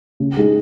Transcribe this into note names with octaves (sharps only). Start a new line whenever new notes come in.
C#3
G#3 D#4 G#4